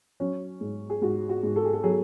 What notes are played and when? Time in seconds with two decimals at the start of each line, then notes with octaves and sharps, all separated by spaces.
0.20 F#3 C#4
0.61 G#2
0.90 G#4
1.02 G#2 F#4
1.29 F#4
1.43 G#2
1.56 A4
1.65 G#4
1.73 A4
1.83 F#3 G#4